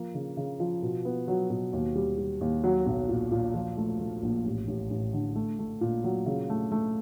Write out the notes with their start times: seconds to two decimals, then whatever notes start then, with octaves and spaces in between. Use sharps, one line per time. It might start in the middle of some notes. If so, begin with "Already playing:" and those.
Already playing: F3 A#3
0.14 C#3
0.37 C#3
0.60 F3
0.82 B2
1.05 B3
1.28 F#3
1.50 B2
1.73 D#2
1.95 G3
2.18 G3
2.41 D#2
2.64 F#3
2.86 B1
3.09 A#2
3.31 A#2
3.54 F3
3.77 A3
4.00 A3
4.23 A#1
4.45 A1
4.68 A1
4.90 A1
5.13 D3
5.36 A3
5.59 A3
5.81 A#2
6.04 F#3
6.26 C#3
6.50 A3
6.72 A3